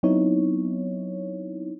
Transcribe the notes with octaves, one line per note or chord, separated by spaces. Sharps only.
F#3 B3 C4 D#4 E4 C#5